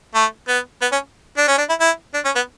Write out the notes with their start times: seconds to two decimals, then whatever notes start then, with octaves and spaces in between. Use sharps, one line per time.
0.15 A3
0.48 B3
0.82 B3
0.92 C#4
1.38 D4
1.48 C#4
1.58 D4
1.69 E4
1.80 E4
2.14 D4
2.25 C#4
2.36 B3